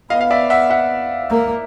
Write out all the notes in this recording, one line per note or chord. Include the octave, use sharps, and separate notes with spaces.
B3 D#5 F5
F5
D5 E5
E5 F#5
E5 F#5
A#3